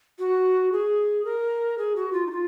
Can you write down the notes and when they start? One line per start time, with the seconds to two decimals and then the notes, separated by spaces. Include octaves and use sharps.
0.19 F#4
0.72 G#4
1.25 A#4
1.78 G#4
1.96 F#4
2.13 F4
2.27 D#4
2.31 F4